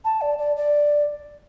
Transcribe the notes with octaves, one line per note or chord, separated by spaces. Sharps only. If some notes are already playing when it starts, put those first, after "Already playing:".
A5
D5
D5
D5